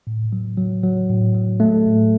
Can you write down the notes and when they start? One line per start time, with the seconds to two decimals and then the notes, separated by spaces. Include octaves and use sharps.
0.07 A2
0.33 F#3
0.58 F#3
0.84 F#3
1.09 A2
1.35 F#3
1.60 F#3 A3
1.86 A2